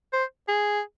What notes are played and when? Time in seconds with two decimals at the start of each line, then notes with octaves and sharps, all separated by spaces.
0.13 C5
0.48 G#4